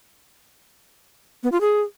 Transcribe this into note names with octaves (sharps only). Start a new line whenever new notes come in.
B3
F4
G#4